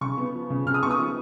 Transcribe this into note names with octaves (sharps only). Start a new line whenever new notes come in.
C#3 C#6
B3
F3
C#3
C#3 F6
D#6
B3 C#6
D#6
F3